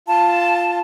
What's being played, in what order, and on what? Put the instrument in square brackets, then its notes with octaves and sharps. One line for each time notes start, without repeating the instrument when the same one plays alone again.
[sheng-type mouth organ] F4 [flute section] A5